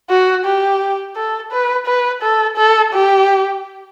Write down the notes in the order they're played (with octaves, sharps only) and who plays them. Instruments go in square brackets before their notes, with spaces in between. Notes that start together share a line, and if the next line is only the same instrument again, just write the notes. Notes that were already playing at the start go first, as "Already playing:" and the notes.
[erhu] F#4
G4
A4
B4
B4
A4
A4
G4